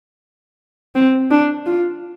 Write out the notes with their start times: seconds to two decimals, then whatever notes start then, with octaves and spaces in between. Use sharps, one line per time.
0.95 C4
1.31 D4
1.66 F4